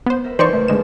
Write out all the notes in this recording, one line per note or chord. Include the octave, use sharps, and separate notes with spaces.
B3 C5
A#4 B4 E5
E3 C#4 D#4 C5 D5 C#6
C#2 F#2 C#3 A3
G#1 D#2 D3 G#3 E7